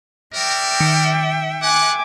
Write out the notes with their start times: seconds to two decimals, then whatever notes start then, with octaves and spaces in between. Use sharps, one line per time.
0.34 F#4 A#4 D5 E5 G5
0.80 D#3 C#7
1.63 D4 F#5 G#5 D6